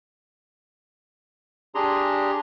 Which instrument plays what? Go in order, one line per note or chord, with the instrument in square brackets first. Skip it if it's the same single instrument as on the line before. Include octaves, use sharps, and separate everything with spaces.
[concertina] D4 G4 G#4 A#5 C6